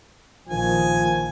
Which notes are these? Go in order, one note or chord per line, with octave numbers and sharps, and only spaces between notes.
A#1 A#2 D#3 F3 G#5